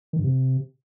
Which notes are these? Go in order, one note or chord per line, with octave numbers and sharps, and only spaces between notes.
D#3
G2
C3